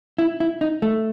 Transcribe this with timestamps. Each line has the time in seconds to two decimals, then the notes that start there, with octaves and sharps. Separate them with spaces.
0.18 E4
0.40 E4
0.61 D#4
0.82 A3